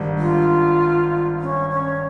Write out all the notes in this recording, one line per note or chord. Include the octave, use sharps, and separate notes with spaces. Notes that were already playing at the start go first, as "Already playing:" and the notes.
Already playing: G#1 G2 G3
F4
C#4
C#4